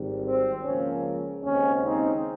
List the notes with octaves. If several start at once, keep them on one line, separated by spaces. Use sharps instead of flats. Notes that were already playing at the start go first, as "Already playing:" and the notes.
Already playing: G#1 G#2 G3
C4
C#2 C#3 F3 A#3 C#4
D#2 C#3 G#3 C4 C#4
C4 D#4